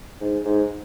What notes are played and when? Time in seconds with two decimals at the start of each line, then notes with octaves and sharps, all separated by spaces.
0.21 G#2
0.45 G#2